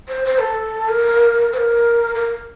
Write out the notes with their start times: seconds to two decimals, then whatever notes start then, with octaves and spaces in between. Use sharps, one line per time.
0.09 C5
0.25 C5
0.40 A4
0.89 A#4
1.53 C5
1.57 A#4
2.15 A#4